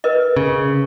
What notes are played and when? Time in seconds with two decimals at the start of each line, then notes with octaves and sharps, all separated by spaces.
0.04 A#4 B4 D#5
0.36 C#3